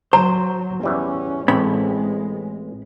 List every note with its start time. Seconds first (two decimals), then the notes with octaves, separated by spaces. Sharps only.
0.13 F#3 C5 A#5
0.83 E2 E3 G3 C#4
1.48 A1 A2 E3 G#3 C4 B5